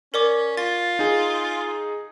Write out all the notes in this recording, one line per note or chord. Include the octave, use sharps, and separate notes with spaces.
C#4 A#4 D5 D6
F4 A6
D#4 G#4